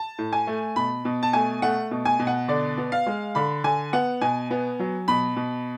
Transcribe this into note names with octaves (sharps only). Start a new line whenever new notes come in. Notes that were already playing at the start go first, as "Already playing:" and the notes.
Already playing: A5
A2
G#5
A3
B2 B5
B2
A5
A3 G#5
A3 F#5
B2
G#5
B2
F#5
D3 D5
B3
F5
G#3
D3 B5
D3 G#5
B3 F#5
B2 G#5
B3
F#3
B2 B5
B2